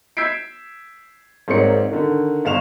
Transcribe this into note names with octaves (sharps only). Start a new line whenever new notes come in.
E6 G6 G#6 B6 C7 D7
G#1 G#2 A#3 C4 C#5 C#7
D3 D#3
G1 F5 C#6 E7 F7